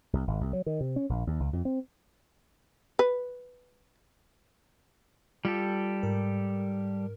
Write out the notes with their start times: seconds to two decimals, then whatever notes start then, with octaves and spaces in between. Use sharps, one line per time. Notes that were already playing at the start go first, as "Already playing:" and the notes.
0.13 C2
0.27 G#1
0.41 C2
0.53 F#3
0.66 D#3
0.81 C3
0.96 C#4
1.09 A#1
1.27 D#2
1.40 C#2
1.53 F2
1.65 C4
2.99 B4
5.45 G3 F4 G4 A4
6.03 G#2 A#4